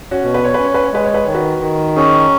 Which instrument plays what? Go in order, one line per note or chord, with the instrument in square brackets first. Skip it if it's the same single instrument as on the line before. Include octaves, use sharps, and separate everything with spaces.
[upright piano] C#4 F#4
[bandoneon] B2
[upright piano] B4
C#5
[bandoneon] C#4 [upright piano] B4
[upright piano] C#5
B4
C#5
[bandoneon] G#3 [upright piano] B4
[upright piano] C#5
B4
[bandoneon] D#3 [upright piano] C#5
[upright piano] F#4 B4
[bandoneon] D#3
[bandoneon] C#4 [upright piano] D#4 G#4